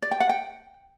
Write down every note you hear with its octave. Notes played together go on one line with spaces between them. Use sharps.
D5
G5
F#5
G5